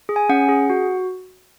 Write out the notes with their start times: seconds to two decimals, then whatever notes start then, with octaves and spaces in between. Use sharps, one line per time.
0.09 G#4
0.16 G#5
0.29 C#4 F#5
0.49 G#4
0.70 F#4